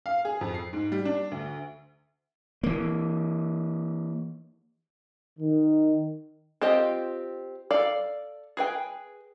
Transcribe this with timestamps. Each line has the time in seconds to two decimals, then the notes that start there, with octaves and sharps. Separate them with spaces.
0.06 F5
0.25 G#4
0.41 F2
0.54 C7
0.73 G#2
0.92 G3
1.05 D4
1.31 D2
2.63 E3 A#3
5.39 D#3
6.62 C4 F4 G4 D#5 G5
7.71 A4 D5 F5
8.57 G#4 B4 G5